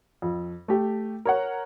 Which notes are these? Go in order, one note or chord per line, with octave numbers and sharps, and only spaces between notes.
F2
A3 G4
A#4 C#5 F#5